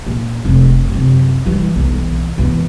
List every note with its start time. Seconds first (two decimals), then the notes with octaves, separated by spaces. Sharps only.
0.07 A#2
0.45 F1 C3
0.90 F#2 C3
1.46 E3 G3
1.76 B1 E3
2.38 B2 E3